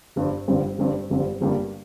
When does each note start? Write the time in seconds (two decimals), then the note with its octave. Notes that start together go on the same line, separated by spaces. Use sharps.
0.16 G1 G2 G3 C4
0.48 G1 G2 G3 C4
0.78 G1 G2 G3 C4
1.10 G1 G2 G3 C4
1.41 G1 G2 G3 A#3